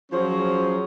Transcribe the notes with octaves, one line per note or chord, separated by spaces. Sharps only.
F3 F#3 C#4 G#4 C5